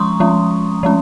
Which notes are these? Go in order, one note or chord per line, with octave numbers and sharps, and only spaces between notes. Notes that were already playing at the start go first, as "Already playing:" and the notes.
Already playing: F3 G#3 C#4 A#5 C6 C#6 D#6
F3 G#3 C#4
F3 G#3 C#4